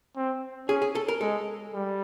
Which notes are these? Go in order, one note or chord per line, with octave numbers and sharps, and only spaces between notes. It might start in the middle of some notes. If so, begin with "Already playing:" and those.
C4
C#4 G#4
G#4
A4
A#4
G#3 A4
G3